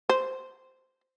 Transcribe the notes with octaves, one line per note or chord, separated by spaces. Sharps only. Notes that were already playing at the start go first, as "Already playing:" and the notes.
C5